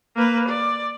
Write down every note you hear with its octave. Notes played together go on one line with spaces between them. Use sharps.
A#3 B4
D5